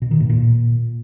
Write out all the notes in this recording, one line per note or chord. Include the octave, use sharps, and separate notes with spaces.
B2
D#3
A2
A#2